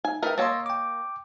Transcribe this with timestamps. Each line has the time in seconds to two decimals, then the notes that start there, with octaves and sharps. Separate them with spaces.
0.05 D#4 G#5
0.23 A3 D#4 A#4 B4 E5 G5
0.38 A#3 C#5 D#5 C6 E6 A6
0.66 G5 D6